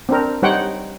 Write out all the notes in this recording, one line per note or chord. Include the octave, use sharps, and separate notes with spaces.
C4 D4 A#4
G3 D#4 C5 C#5 F#5 G5